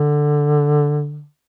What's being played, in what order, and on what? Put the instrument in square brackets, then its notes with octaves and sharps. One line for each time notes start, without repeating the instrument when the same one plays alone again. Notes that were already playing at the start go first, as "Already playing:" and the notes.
Already playing: [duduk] D3